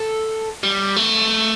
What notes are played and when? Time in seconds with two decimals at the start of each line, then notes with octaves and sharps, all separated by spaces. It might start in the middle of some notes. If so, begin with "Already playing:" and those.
Already playing: A4
0.63 G3
0.96 A3